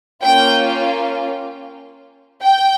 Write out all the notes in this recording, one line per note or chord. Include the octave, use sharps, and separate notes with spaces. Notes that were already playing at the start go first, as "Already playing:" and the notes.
A#3 C#4 F4 G5
G5